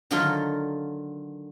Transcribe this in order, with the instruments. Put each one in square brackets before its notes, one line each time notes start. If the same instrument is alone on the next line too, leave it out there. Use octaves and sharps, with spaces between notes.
[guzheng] D3 D#3 F#3 F4 A4 A#4